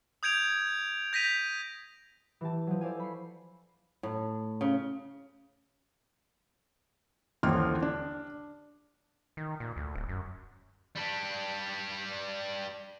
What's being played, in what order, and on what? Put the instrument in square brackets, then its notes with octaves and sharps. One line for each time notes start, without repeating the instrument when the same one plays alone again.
[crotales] D#6 G6 G#6 D7 F7
G6 A#6 B6 D#7 F7
[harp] E3 G4 A5
F3 F#3
A4 C5 D5 F5 G#5
B5 C#6 C7
[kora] A2
C#3
[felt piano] D#1 A#1 D3 E3 C6 F6
D4
[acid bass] D#3
A#2
D2
D1
F#2
[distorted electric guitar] G3 D4